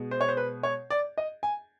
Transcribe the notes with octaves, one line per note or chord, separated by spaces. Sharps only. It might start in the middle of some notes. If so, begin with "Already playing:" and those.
Already playing: B2 G#3
C5
C#5
C5
B4
C#5
D5
D#5
G#5